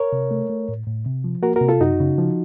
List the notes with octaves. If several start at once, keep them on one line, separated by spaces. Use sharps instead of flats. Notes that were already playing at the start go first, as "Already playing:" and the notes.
Already playing: A#4 C#5
C3
A3
A3
A2
A2
C3
F3
A#3 F#4 A#4
F#4 A#4
C3
F4 A4
F#2 D#4 F#4
C#3
F3